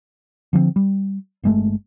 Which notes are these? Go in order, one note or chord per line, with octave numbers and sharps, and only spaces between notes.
D3 F3 G3 C4
G3
G1 G#3 A3